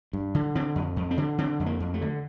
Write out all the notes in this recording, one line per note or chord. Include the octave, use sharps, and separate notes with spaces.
G2
D3
D3 C4
F2
F2
C4
D3
D3 C4
F2
A#3
F2
A3
D3